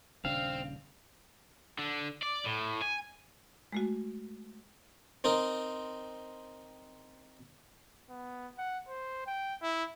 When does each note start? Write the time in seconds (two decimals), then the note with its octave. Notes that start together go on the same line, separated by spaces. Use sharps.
0.25 D#1 C#3 C4 D4 F5
1.79 D3
2.23 D5
2.46 A2
2.82 G#5
3.72 G#3 A3 F#4
5.24 C4 D#4 A#4
8.09 B3
8.58 F#5
8.88 C5
9.27 G5
9.62 E4